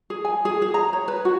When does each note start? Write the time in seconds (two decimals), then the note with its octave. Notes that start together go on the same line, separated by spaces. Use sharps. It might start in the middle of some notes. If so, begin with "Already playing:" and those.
0.10 G#4
0.25 G#5
0.45 G#4
0.62 G#4
0.74 A#5
0.93 C#5
1.08 B4
1.25 F#4